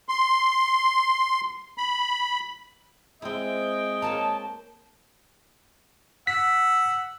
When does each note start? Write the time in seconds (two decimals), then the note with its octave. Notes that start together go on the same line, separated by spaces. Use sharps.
0.09 C6
1.78 B5
3.22 G#3 C4 E4 D#5 G5
4.02 A#3 A#4 C#5 A5
6.27 F#5 E6 B6